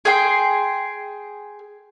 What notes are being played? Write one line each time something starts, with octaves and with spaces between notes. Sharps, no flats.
G#4 G5 C6